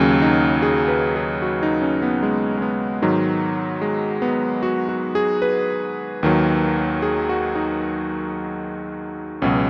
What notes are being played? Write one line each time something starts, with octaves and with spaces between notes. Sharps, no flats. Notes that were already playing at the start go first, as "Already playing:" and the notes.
Already playing: D#2 C#3 F#3 C#4
D#4
G#4
B4
G#4
F#4
D#4
C#4
B3
G#3
G#3
B3
G#2 D#3 F#3
G#3
B3
F#4
F#4
G#4
B4
D#2 D#3 F#3
G#4
F#4
D#4
C#2 B2 F#3 C#4